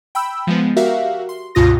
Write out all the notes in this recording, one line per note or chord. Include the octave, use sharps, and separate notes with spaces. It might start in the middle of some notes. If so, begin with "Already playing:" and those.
G5 B5 E6
F3 G#3 B3
F#4 G4 A#4 E5 F5
C6
C#2 G2 B2 F4 D#6 A#6